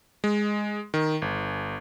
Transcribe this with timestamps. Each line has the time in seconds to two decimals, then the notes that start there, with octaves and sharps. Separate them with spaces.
0.24 G#3
0.94 D#3
1.22 G1